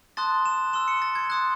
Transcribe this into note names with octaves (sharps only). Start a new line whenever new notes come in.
A5 C6 D#6 F#6 A6
E7
C6 E6 E7
C#7
A6
G#6
C6 D#6 F#6 A6